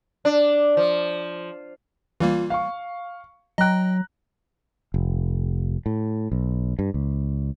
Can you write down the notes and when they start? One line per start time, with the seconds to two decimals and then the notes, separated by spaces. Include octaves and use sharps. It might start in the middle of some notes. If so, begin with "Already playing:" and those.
0.25 D4
0.77 F3
2.20 E3 G3 A#3 F4
2.50 F5 C#6
3.58 F#3 D#5 G5 A#5 F#6
4.94 F1
5.86 A2
6.32 B1
6.79 G2
6.94 C#2